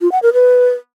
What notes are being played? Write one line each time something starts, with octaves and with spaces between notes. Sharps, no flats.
F4
F#5
A#4
B4